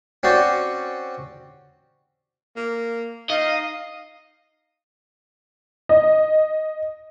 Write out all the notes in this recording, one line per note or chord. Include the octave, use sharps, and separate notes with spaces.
C4 C#4 F#4 C5 D5
A#3
D#4 D#5 F5
D#5